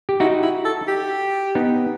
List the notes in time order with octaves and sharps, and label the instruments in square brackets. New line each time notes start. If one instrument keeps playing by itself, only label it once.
[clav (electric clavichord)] G4
[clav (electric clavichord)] D#4 F#4 [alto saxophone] E4
[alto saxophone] E4
A4
G4
[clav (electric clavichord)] B3 D#4